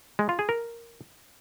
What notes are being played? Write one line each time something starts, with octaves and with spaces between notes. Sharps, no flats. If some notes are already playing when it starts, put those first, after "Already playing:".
G#3
F4
G#4
A#4